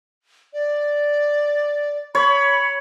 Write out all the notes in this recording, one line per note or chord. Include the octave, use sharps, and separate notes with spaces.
D5
C#5 B5